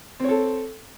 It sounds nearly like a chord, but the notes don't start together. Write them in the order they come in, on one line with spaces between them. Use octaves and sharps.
C4 C#5 A4